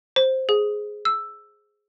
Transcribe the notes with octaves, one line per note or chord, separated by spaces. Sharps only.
C5
G#4
E6